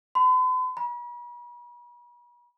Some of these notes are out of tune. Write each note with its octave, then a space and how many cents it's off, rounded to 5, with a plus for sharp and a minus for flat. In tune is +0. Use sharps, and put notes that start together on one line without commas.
B5 +45
B5 -45